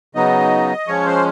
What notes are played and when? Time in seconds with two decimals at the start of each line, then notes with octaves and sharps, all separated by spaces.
0.15 C#3 F#3 B3 D#4 D#5
0.87 F3 G#3 C#4 C#5
1.06 C5